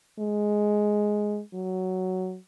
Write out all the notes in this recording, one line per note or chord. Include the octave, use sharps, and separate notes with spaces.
G#3
F#3